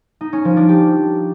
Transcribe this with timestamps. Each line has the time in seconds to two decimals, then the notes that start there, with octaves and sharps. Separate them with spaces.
0.21 D#4
0.33 C#4
0.45 F3
0.57 D4
0.69 G4